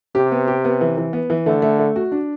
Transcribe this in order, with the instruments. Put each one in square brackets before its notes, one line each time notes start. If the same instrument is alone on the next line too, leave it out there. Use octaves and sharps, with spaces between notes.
[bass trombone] C3 [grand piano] G4
[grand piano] B3
G4
B3
E3
E3
B3
E3
[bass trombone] D3 [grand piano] A3
[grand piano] A3
A3
F#4
D4